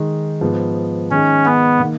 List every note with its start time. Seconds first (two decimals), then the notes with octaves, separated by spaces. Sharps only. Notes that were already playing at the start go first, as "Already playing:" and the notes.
Already playing: D#3 G#3 D#4
0.41 G#2 F3 B3
1.11 D#3 G#3 C#4 D#4
1.45 B3
1.80 D#3 A#3 D#4